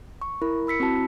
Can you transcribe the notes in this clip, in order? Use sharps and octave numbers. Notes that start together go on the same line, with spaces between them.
C#6
E4 A#4 B5
B5 E6 B6 C#7
C4 E4 F#4 A5